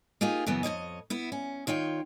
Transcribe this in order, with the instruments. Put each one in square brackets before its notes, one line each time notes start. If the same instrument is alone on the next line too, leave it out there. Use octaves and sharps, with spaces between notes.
[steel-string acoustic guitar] A#3 D#4 F4 G4 G#4
F#2 C#3 E3 B3
F2 G#2 C#5 D#5
B3 E4
C#4
D#3 F4 C#5 G5